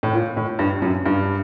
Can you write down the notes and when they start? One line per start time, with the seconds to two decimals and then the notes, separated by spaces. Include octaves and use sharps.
0.03 A2
0.13 A#2
0.37 A2
0.59 G2
0.82 F#2
1.06 G2